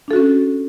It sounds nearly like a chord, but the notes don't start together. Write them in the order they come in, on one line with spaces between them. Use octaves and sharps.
D4 A4 F#4 C#4